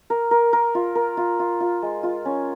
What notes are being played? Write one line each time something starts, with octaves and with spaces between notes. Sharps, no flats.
A#4
A#4
A#4
F4
A#4
F4
F4
F4
G#3
F4
C#4